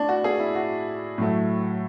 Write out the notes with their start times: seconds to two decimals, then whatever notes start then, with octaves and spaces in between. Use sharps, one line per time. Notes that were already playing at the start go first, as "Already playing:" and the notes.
Already playing: A2 D4
0.09 F#4
0.24 G#4
0.39 E4
0.55 F#4
1.18 A2 F#3 A3